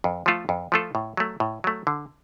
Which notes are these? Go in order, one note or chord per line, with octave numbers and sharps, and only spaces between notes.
F2
F3 A3 F4 A4
F2
F3 A3 F4 A4
A2
F#3 A3
A2
F#3 A3
D3